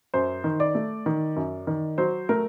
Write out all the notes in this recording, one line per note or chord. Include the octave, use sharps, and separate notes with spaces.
F#2 C5
D#3
D5
A3
D#3
F#2
D#3
F#3 C5
A3 A#4